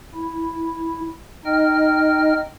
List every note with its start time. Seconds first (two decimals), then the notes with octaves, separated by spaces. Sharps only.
0.15 E4
1.46 D#4 D#5 G5 F6